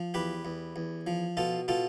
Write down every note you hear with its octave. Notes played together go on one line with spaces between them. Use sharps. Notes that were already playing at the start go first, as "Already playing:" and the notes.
Already playing: F3
E2 G4 B4
E2
E2
F3
B2 F4 A4
B2 F4 A4